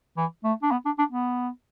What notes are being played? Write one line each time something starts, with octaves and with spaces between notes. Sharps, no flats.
E3
A3
D4
B3
D4
D4
B3